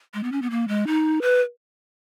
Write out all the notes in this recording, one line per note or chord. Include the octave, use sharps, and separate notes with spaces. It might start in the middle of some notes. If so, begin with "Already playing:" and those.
G#3
B3
C#4
B3
A#3
G#3
D#4
B4